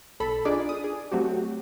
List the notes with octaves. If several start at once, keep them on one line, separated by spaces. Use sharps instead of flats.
B1 A4 B5
D4 D#4 F4 G#4 D5
D#6
G#4
F#3 A3 C4 F#4 G4